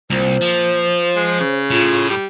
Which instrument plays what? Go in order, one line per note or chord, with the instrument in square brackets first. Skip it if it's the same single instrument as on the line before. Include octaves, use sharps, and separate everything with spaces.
[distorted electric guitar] C2 [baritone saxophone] A#2 [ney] C5
[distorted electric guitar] F3
[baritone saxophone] G#3
C#3
[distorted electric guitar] A2 [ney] F4
[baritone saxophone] G3